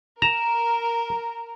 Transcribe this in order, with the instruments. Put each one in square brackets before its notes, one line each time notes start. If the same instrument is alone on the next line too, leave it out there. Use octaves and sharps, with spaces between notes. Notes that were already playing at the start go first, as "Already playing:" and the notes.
[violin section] A#4 [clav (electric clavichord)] A#5 [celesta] E7